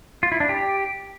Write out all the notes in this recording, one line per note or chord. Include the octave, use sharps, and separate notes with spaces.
F4
E4
D4
G4